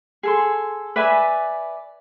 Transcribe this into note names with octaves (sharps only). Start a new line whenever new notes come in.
G#4 A4 C6
B4 D5 E5 G#5